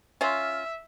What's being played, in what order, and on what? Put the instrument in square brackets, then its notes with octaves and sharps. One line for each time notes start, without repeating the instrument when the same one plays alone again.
[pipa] C#4 F4 [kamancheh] E5